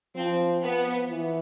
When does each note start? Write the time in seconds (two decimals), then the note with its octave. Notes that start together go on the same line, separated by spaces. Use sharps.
0.16 F3 C4
0.63 B3
1.10 E3